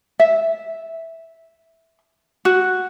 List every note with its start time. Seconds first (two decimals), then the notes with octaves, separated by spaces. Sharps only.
0.20 E5
2.45 F#4